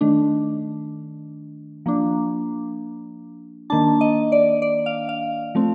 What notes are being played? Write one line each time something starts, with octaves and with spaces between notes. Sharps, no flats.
D#3 A3 D4
F3 A#3 D4
D#3 A#3 D4 A5
D#5
D5
D5
F5
F5
F3 A3 C4